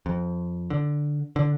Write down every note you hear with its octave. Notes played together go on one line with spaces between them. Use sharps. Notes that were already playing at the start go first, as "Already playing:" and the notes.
F2
D3
D3